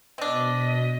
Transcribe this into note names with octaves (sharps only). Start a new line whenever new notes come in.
B2 C4 D4 D#5 B6